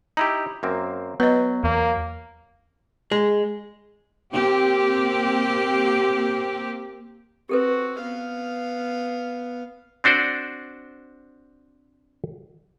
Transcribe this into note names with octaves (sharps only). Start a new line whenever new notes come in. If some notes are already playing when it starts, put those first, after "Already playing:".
D#4 E4 G4 A#5
F#2 A#3 C4
F#3 B3 B4 D#5
E2 A#3
G#3
A#3 C4 G4
C4 F#4 G4 A4 B4
B3 F5
C4 D4 F#4 C5 D5